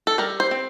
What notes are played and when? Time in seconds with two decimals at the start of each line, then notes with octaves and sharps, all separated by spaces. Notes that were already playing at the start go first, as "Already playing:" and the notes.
0.07 A4
0.18 G3 A#4
0.40 C5
0.51 C4